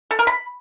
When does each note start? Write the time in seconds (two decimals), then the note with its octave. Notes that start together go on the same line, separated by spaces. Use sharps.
0.11 A4
0.19 A#4
0.27 B5